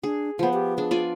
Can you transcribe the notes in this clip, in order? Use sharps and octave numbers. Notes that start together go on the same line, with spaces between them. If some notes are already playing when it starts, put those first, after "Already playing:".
D4 G#4
F3 B3 C5
G4
D4 G#4
F4 D5 G#5